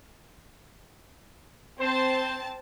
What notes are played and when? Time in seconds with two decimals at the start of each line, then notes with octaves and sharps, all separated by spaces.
1.80 C4 C5 A5